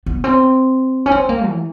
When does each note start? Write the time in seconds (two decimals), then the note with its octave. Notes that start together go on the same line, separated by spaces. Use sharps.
0.06 B3
0.24 C4
1.06 C#4
1.11 C4
1.29 A#3
1.46 E3